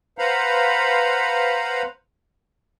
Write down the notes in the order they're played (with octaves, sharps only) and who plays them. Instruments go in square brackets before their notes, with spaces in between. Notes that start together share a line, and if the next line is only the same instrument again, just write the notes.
[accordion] B4 C5 F5 F#5 A#5 B5